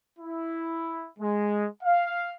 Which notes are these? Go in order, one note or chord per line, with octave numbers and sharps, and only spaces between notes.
E4
G#3
F5